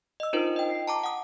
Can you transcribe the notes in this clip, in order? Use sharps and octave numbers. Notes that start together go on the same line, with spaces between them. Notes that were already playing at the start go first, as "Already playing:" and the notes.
D#5 E6
D4 D#4 F4 A#4 C5
D#5 G5
C7
A5 A#5 D6
F#5 D#6